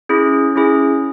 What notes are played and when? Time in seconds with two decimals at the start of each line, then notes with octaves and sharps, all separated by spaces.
0.09 C#4 E4 G#4
0.56 C#4 E4 G#4